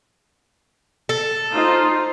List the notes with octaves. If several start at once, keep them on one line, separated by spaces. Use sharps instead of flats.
A4
D#4 F4 C5